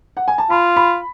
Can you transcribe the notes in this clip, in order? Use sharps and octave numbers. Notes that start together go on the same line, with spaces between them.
F#5
G#5
A5
F4 B5
B5